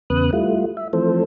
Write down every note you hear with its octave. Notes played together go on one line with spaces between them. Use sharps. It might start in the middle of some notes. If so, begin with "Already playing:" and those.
E2 C#3 B3 B4 D#6 F#6
G3 A3 E4 F4
E5
E3 F3 A3 C4 A4 C5